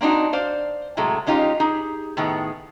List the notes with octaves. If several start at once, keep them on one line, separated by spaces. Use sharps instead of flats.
A#3 C4 D4 D#4 F#4
C5 D5 F5
A2 C3 F#3 G#3 A3
G#3 C#4 D#4 F4 G4
D#4 G4 G#4
A2 D#3 B3 G#4